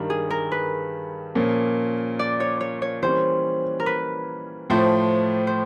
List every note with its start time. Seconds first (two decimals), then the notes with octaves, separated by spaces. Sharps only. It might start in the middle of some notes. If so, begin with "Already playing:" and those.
Already playing: G2 D#3 G3 A#4
0.10 G#4
0.30 A#4
0.52 B4
1.35 A#2 F3 A#3 C#4
2.19 D5
2.40 C#5
2.61 C#5
2.82 C#5
3.03 E3 G3 A#3 C#4 C5
3.80 A#4
3.86 B4
4.70 A2 F3 A3 C5
5.47 C5